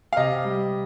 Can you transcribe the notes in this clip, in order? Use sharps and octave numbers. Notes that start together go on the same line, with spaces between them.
F5
C3 D#5
G3